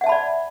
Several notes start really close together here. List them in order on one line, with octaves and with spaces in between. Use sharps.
F#5 E5 A5 B5 D5